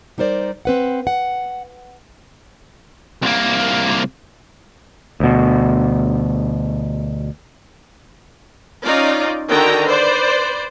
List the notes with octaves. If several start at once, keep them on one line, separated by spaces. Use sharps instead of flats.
G3 D#4 A#4 C5 D5
C4 B4 F#5
F#5
C2 A#3
D2 B2
C#4 D#4 F4 D5
D3 D#3 F#4 G5 A#5
B4 C5 D5